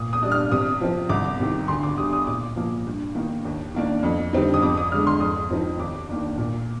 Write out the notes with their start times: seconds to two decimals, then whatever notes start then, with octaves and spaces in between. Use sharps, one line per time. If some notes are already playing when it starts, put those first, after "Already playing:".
Already playing: A#2 D#6
0.13 D#6
0.23 G3 D4
0.31 F6
0.52 C3 D#6
0.81 F3 C4
1.09 C2 D6
1.40 C3 D#3
1.68 D2 C6
1.83 D6
1.97 D3 G3 D#6
2.13 D#6
2.27 A#2 D6
2.56 F3 A#3
2.86 G2
3.15 D#3 A#3 D#4
3.45 D#2
3.75 D#3 A#3 D4
4.03 F2
4.33 D3 G3 C4 D#4
4.54 D#6
4.62 F2 D6
4.77 D#6
4.91 D3 G#3 F6
5.07 C6
5.20 F2 D#6
5.51 C3 F3 C4 D#4
5.79 D#2 D6
6.09 D#3 A#3 D4
6.38 A#2